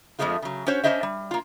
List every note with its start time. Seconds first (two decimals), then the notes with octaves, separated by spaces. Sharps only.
0.19 F2 D#3 F3 G#3 A3 F4
0.42 C#3 F#3
0.67 C#4 F#4 C5 C#5
0.84 C#4 D4 F4 C5 D#5 E5
1.03 G3
1.31 A#3 F4